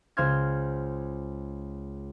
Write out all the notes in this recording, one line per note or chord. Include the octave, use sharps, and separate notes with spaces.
C#2 C5 C6 F6 G#6